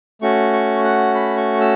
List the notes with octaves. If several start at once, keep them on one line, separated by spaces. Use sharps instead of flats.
A3 C#4 F#4 C#6
C#6
F#5
B5
C#6
E6